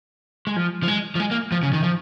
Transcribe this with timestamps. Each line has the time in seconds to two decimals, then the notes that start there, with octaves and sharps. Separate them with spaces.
0.47 G#3
0.56 F3
0.83 F3
0.88 G#3
1.15 F3
1.20 G#3
1.31 A#3
1.52 F3
1.63 C#3
1.73 D#3
1.83 F3